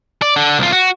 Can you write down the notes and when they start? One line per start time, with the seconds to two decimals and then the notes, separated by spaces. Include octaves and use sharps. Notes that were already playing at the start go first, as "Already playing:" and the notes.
0.22 D5
0.36 D3
0.59 C2 F4
0.72 F#4